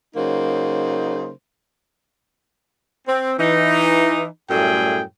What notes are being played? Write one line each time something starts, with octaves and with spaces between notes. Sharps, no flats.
C#3 F#3 A#3 D#4 C5
C4
E3 D#4
F#2 A2 G3 A3 G#4 G5